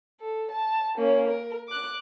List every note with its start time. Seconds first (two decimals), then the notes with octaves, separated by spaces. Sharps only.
0.21 A4
0.51 A5
0.98 A#3 C#4
1.27 A#4
1.68 D6 F#6